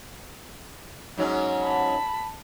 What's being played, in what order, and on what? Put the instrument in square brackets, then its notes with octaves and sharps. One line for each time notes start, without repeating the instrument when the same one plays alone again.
[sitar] G#2 F#3 C#4
[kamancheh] A5 B5